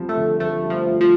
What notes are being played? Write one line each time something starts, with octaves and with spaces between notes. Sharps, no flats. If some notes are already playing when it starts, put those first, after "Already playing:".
Already playing: F3 G3 C4
A3
D3
F3 A3
G3
F3
A3
F3